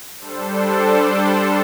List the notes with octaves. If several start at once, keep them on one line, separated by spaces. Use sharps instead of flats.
G3 D4 A4 C5